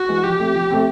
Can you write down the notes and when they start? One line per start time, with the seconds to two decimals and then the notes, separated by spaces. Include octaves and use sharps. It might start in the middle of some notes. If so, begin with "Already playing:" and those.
Already playing: F#4
0.09 E3 G#3
0.24 F3 G4
0.39 A3 C4
0.55 F3
0.70 A3 C4